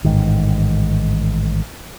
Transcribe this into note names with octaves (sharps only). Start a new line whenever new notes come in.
A1 G#2 D#3